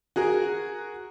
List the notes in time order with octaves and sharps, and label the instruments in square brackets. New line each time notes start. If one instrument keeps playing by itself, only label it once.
[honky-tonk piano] F#4 G#4 A#4